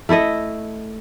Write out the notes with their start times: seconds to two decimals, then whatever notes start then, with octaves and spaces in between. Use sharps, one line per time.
0.09 A3 E4 A4 D#5